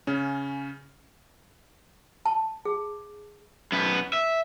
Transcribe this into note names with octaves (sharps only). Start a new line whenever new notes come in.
C#3 C#4
A5
G#4
F#2 B3
E5